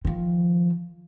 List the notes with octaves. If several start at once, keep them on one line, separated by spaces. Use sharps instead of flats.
D#3 F3